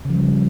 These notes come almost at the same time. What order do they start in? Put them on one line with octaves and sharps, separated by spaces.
C#3 F3 G3